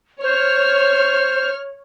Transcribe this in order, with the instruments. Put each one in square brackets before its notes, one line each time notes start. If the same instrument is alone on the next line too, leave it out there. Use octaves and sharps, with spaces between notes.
[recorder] C5 [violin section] C#5 F6